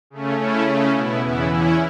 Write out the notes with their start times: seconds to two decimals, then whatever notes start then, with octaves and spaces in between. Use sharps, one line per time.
0.10 C#3 A3 C#4
0.38 C#3 A3 C#4 E4
0.66 C#3 A3 C#4
0.94 B2 B3 E4
1.23 E2 C#3 E3 B3 E4
1.51 E2 E3 C#4 E4